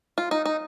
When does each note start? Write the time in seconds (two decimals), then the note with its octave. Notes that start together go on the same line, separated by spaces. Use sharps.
0.18 F4
0.31 D#4
0.46 D#4